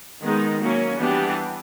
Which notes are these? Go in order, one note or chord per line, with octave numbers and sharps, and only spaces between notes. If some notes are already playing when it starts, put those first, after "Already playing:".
D#3 G#3 B3 D#4
F#3 A#3 C#4
E3 G3 B3 D4 G4